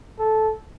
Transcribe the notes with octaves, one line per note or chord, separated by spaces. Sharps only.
A4